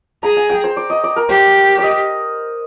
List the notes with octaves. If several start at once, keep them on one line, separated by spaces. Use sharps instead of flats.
G#4 A#5
G#5
G5
C5
D5
D#5
D5
A#4
G4 C5
D5 D#5